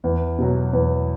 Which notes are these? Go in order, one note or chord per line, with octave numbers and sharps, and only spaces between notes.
E2
B2 F#3
E2